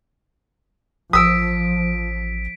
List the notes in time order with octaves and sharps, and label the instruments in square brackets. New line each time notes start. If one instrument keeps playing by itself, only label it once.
[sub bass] A1 [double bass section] F3 [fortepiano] D#6 E6 [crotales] B6 D7